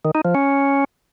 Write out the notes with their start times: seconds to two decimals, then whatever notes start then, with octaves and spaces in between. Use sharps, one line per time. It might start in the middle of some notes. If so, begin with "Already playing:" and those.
0.05 D#3
0.15 D#4
0.25 F3
0.35 C#4